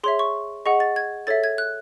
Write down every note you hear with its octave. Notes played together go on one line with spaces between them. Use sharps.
G#4 C#5 E5 C6
C#6
G#4 D#5 F#5 C#6
A6
G#6
A4 C#5 E5 A6
G#6
F#6